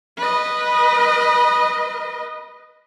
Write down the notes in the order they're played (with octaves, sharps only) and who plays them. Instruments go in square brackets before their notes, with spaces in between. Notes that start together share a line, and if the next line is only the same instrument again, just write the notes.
[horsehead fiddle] B4 D#5